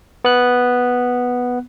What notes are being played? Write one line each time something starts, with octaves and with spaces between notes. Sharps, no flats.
B3 F#6